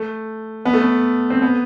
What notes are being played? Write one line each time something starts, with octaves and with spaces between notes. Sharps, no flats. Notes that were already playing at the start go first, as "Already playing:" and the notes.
Already playing: A3
B3
A3
B3
C4
B3